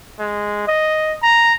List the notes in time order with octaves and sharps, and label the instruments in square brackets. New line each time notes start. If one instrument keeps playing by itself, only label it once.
[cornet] G#3
D#5
A#5